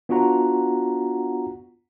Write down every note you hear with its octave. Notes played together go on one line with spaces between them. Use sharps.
B3 D4 F4 F#4 F#5 A#5